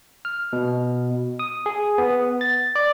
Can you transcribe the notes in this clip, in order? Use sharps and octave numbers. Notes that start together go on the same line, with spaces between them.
F6
B2
D#6
G#4
B3
A6
D5